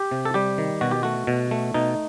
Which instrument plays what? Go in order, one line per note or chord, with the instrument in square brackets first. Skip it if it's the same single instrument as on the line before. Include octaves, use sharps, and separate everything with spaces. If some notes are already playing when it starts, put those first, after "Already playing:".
Already playing: [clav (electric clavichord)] G4
C3
A4
G3 G4
D#3
B2 F#4
G4
A3 F#4
B2
A3
B2 D#4